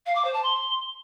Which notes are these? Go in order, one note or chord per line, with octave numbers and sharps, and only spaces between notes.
F5
D6
C5
A5
C6